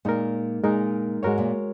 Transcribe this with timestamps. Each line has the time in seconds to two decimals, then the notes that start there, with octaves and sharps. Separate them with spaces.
0.05 A#2 G#3 D#4 A#4
0.63 A#2 G#3 D#4 A#4
1.23 G#2 G#3 F#4 A#4 C#5
1.38 A#2